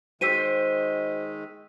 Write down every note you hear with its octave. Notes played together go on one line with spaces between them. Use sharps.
D#3 G#3 F#4 C5 G5 E6 B6 D#7